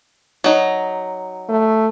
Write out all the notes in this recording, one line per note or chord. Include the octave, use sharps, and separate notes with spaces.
F#3 D#4
A3